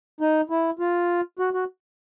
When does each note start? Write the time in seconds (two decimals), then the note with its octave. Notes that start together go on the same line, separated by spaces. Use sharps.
0.21 D#4
0.50 E4
0.79 F4
1.39 F#4
1.54 F#4